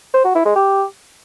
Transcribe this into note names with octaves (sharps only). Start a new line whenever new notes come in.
C5
F#4
E4
G#3
G4